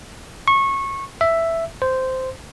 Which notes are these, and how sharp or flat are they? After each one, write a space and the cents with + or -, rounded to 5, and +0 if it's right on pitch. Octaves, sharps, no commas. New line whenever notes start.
C#6 -20
E5 +5
C5 -10